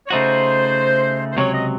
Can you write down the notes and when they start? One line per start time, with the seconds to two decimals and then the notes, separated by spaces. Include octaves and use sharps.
0.07 C#5
0.10 C#3 A3 D#4 F#4 C5
1.32 C5
1.37 C#2 C3 D#3 F#3 C#5
1.53 D#5